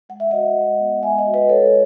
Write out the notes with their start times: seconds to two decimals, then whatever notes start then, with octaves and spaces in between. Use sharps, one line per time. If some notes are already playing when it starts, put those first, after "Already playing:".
0.09 G#3 F#5
0.20 E5
0.31 F#4 D#5 F#5
0.56 G#3
0.79 B3
1.03 G#3 E5 G#5
1.18 D#5 F#5
1.26 F#4
1.34 B4 D#5
1.49 G#3 A4 C#5